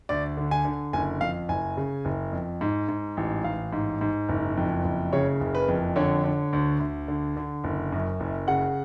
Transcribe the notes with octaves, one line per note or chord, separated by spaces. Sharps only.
D2 D5
D3
G#5
D3
F#1 G#5
F2 F5
F#1 G#5
C#3
F#1
F2
G#2
G#2
A1
A1 F5
G#2
G#2
F#1
F2
F#1
C#3 C#5
F#1
B4
F2
D3 C#5
D3
D2
D2
D3
D3
F#1
F#2
F#1
C#3 F#5